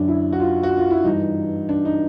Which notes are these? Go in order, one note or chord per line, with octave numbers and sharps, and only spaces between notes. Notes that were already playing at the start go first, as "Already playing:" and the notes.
Already playing: F#2 D3 F#3 D4
E4
F#4
F4
F#4
F4
E4
G2 E3 G3 D#4
D4
D#4